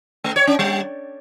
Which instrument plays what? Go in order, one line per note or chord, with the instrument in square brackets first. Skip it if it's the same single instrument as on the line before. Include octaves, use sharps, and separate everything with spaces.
[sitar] A3
C#5
C#4
G3